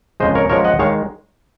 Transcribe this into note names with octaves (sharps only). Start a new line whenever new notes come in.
F2 C#3 G#3 C5 D#5
A#4 C#5
F#2 F3 G#3 A#4 C#5
D#5 F#5
D#3 G#3 C#5 F5